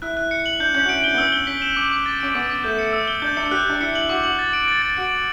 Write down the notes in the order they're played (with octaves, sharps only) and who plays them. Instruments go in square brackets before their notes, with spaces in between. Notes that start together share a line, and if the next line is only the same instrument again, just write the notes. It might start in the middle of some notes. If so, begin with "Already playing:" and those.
[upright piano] E4 [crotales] F#6
[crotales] F#6
C#7
F#7
[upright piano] D4 [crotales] G6
[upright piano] C#4 [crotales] G6
[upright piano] F#4
[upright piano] E4 [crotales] D7
[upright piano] D4 [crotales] G7
[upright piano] B3
[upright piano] C#4 [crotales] E6
[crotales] G7
[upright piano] C#4 [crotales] B6
[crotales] E7
D6
D6
A6
[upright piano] C#4 [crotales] D7
[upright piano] B3 [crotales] D6
[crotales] D6
[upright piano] A3 [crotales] G6
[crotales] C#7
E6
G7
[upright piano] D4 [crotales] G6
[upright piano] D4 [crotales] C#7
[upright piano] G4 [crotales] F#6
[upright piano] D4 [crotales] F#6
[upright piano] E4 [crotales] C#7
[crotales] F#7
[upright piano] F#4 [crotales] D6
[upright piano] F#4 [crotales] F#7
[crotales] A6
D7
A6
A6
[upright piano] F#4 [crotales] D7
[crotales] F#7